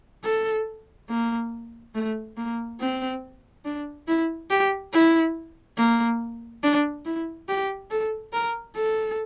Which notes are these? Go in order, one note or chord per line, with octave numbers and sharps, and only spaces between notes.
A4
A#3
A3
A#3
C4
D4
E4
G4
E4
A#3
D4
E4
G4
A4
A#4
A4